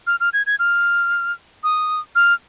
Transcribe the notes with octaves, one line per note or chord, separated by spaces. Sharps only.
F6
F6
G#6
G#6
F6
D#6
F6